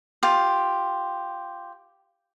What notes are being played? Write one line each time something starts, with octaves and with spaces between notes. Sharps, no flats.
F4 G4